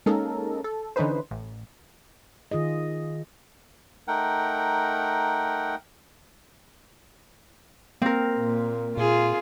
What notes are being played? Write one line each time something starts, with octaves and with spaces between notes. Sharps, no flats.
G#3 A#3 C#4 D#4 A4 A#4
A4
D3 E3 C#4 D#4 B4 C5
A1
D#3 F4 G#4 D#5
A3 D#4 A#4 F#5 G5
A#3 C4 A#4
A#2
A#2 F4 G#4